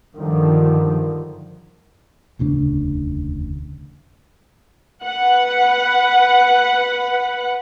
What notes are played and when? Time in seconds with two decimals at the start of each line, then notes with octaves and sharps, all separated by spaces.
0.15 G2 D3 D#3 F3
2.39 E1 D2 C#3 D4
5.04 B4 F#5